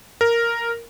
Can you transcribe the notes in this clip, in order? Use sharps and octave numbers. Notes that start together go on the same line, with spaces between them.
A#4